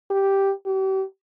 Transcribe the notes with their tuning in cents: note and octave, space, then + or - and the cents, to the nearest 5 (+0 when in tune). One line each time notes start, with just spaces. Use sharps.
G4 +0
G4 -40